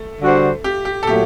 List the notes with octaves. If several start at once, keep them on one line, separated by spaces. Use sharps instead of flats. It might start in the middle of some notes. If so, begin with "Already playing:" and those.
Already playing: A3
D3 G3 D4 F#4 C5
G4
G4
A4
A#2 F#3 A3 G4